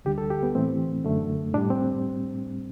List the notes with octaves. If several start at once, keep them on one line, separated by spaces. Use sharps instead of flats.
D2 D3 G3 G4
A4
G4
B3
A2 E3 A3 C4
F#2 D3 A3
A2 G3 D4
C4